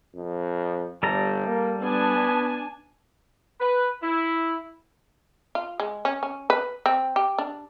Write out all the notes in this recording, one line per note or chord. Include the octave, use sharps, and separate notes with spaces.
F2
G1 G3 A4 A#5
A#3
B3 D4 G#5 A5
B4
E4
F4
G#3
C#4
C#4
B4
C4
G4
D4